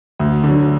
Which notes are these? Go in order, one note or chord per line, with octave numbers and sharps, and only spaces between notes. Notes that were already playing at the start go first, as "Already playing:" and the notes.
D2
D3
F#3